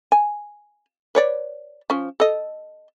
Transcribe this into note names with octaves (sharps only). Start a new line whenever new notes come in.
G#5
B4 C#5 D5
F3 C#4
A4 D#5